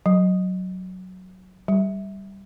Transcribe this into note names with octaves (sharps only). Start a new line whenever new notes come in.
F#3
G3